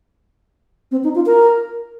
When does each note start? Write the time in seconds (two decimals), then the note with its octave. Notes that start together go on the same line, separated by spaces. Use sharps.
0.91 C4
1.04 D#4
1.15 F4
1.26 A#4